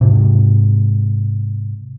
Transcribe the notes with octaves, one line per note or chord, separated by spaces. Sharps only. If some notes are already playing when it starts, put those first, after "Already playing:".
G#2 C3